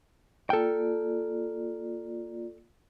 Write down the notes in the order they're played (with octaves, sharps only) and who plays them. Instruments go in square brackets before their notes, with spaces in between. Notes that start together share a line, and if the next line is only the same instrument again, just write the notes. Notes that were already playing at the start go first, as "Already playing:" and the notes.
[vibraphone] A#3 F4 D5 [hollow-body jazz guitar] A4 G5